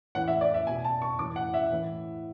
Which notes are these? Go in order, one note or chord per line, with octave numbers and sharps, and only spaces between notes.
A2 E3 F#5
E5
D5
E5
B2 G#5
A5
C#6
A2 E3 D6
F#5
E5
A2 E3